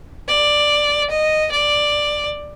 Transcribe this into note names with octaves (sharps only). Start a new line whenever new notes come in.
D5
D#5
D5